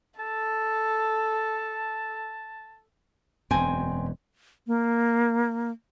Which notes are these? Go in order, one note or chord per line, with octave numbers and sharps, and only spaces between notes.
A4 A5
E1 F#2 C4 G#5
A#3